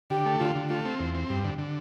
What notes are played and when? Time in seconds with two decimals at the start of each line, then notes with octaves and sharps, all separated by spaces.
0.10 D3 G4
0.26 A3
0.40 D3 F4
0.55 D3
0.70 A3 F4
0.85 C4
1.00 E2
1.15 C4
1.30 G2 G4
1.45 D3
1.58 D3